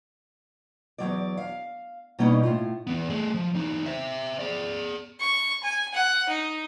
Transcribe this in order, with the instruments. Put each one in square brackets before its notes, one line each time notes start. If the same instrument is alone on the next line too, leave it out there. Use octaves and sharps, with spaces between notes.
[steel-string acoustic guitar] E2 G#2 F#3 D5
F5
B2 G3 A#3 C#4 D#4
A2 F4
[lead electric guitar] E2 B3
A3 G#4
F3
E2 D#4
C5 E5
G#4 D5
[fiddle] C#6
G#5
F#5
D#4